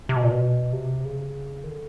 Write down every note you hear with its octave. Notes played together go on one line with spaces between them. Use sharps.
C3
B2
A#2
B2
C3
C#3
D#3
D3